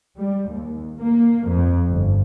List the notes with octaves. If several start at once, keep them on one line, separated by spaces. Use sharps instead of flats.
G3
D#2
A#3
F2
G1